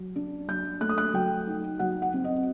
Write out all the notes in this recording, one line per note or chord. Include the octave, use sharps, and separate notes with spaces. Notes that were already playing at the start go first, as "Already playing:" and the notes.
Already playing: F#3
D4
F#3 G6
A3 F#6
D#6
F#6
F#3 G5
D#4
F#3 F#5
F#5
C4
D#5